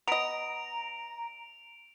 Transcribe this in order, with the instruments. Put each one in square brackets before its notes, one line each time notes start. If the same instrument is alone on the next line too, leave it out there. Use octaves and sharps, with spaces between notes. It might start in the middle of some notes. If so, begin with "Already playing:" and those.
[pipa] B3 D#5 [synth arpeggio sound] A#5 [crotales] D7 F7